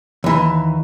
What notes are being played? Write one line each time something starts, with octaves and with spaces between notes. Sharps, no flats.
D#2 E3